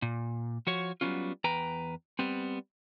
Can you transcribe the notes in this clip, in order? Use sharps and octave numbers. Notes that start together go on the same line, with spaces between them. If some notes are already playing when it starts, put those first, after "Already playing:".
A#2
F3 F#4 C#5
F#3 G3 B3 C#4 F4
E2 B4 G5 A#5
G3 B3 C4